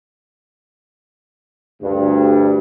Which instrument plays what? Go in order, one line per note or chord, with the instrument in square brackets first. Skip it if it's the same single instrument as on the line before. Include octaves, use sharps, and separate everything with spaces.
[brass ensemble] D2 G2